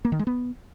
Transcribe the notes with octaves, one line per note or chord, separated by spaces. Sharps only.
A#3
D#3
G#3
B3